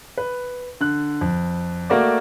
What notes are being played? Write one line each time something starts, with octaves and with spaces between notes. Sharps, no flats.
B4
D3 F#6
F2
A3 A#3 F#4 D5